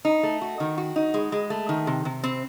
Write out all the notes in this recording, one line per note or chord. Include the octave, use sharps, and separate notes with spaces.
D#4
A3
F#4
D#3
F#4
D#4
G#3
G#3
A3
D#3
C3
C3
C4